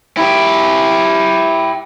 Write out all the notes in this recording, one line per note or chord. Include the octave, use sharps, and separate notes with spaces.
E4 G4